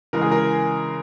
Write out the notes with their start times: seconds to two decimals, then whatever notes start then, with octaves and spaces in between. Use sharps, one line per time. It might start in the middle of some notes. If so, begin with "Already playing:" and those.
0.13 C#3 E3 G#3 A#4
0.21 G#4
0.31 A#4